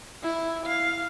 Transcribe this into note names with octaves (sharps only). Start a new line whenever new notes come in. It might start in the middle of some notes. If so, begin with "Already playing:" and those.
E4
F5